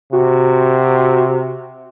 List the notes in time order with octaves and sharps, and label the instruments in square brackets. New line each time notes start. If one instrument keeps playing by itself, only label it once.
[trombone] C3 [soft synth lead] F#4